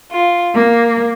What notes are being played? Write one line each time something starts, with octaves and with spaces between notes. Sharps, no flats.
F4
A#3